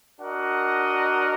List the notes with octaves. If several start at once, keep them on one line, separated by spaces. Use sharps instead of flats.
D4 F#4 A#4 D#5 F#5